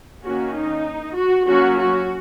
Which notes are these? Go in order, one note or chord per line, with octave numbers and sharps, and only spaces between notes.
D#3 A#3 C#4 F#4
D#4
F#4
F#3 A#3 C#4 F#4
F#4